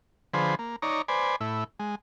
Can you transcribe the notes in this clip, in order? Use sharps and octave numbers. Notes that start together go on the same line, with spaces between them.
D3 F3 G#4 B4 C5
A#3
D#4 C#5 D5 A#5
B4 C5 D5 G#5
A2 E4
G#3